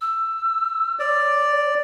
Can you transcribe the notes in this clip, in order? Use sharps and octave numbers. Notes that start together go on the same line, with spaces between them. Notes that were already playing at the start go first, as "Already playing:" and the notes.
E6
C#5 D5